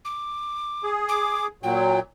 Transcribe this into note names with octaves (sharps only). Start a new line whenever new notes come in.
D6
G#4
D6
A#2 F#3 G5